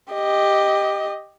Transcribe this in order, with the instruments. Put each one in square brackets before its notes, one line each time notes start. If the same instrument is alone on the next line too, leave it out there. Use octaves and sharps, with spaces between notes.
[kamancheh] G4 D#5